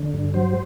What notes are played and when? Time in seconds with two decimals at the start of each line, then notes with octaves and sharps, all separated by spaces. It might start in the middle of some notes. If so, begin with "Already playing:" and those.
Already playing: D3
0.14 G2
0.34 F#3 C5